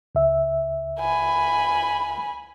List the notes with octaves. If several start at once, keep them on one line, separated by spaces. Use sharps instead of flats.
C#2 E5
G#5 B5